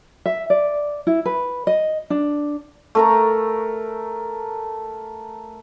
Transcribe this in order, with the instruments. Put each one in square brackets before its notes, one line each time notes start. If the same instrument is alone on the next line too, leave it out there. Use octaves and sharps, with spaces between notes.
[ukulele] E5
D5
E4
B4
D#5
D4
[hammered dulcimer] A3 A#4 A#5